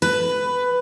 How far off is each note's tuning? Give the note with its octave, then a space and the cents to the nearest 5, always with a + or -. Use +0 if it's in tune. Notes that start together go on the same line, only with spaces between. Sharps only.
B4 +10